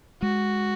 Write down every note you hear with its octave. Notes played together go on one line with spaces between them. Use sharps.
G#3 F#4